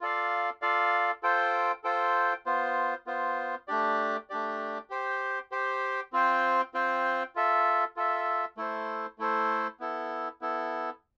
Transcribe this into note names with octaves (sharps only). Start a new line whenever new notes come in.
F4 A4 D5 F5
F4 A4 D5 F5
F4 A4 C5 G5
F4 A4 C5 G5
B3 F4 C5
B3 F4 C5
A3 D4 G4 D5
A3 D4 G4 D5
G4 C5 G5
G4 C5 G5
C4 F4 C5 G5
C4 F4 C5 G5
F4 A4 E5
F4 A4 E5
A3 E4 A4 C5
A3 E4 A4 C5
B3 E4 A4
B3 E4 A4